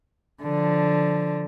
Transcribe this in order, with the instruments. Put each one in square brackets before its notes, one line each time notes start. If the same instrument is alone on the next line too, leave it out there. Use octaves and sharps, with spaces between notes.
[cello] D3 F3